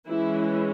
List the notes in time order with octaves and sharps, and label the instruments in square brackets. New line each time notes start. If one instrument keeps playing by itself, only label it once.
[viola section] E3 G#3 C#4 E4